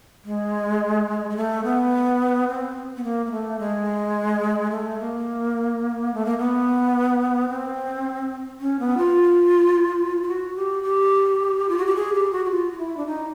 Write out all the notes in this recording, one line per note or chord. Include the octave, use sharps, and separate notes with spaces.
G#3
G#3
A3
B3
C4
B3
A#3
A#3
A3
G#3
A3
A#3
A3
A#3
B3
C4
C#4
B3
F4
F4
F#4
G4
G4
F4
F#4
G4
G#4
G4
F#4
F#4
F4
F4
E4
D4
D#4